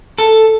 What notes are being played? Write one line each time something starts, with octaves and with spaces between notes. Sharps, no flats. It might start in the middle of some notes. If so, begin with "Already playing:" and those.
A4